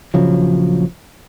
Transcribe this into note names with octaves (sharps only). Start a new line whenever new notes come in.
A#1 C#3 F3 F#3